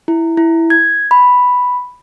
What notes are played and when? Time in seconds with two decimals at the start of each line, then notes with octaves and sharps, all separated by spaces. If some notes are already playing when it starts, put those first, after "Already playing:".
0.08 E4
0.37 E4
0.70 G#6
1.11 B5